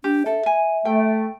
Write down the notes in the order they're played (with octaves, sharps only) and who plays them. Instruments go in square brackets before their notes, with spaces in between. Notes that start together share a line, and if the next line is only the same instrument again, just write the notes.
[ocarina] D4 [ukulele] G4
[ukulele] A4 [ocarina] E5
[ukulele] G#5
[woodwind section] A3 [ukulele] G5